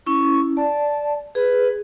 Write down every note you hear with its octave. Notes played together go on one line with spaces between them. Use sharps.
C#4 E4 C#6
D5 A5
G#4 B4